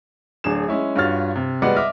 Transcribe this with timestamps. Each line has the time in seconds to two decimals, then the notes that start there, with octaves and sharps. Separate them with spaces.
0.44 D1 D4 G#4 E7
0.68 G#3 C#4 E4
0.96 G2 F4 F#4 C#5 F6 A6
1.36 C3
1.62 G3 G#3 B3 F#4 D5 F#5
1.76 D#5 E5 D6 F6